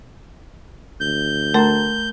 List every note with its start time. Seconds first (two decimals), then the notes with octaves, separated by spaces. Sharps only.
1.00 D2 G6
1.54 A3 A#4 A5 C6